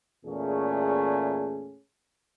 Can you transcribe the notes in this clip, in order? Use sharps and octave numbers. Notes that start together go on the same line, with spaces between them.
E2 A#2 A3 C#4 G#4